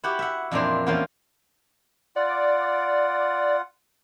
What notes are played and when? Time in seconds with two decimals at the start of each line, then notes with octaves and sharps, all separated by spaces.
0.03 E4 F#4 G4 F#5
0.19 E5 F#5
0.51 F2 A#2 E3 A#3 D4 C5
0.86 E2 A#3 C#4 F4 C5
2.16 F4 D5 F#5